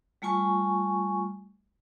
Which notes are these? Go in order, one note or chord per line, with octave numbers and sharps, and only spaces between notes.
G3 A3 F4 G#5 C#6